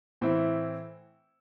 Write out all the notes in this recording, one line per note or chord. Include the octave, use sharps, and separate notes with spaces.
A2 E3 C4 E4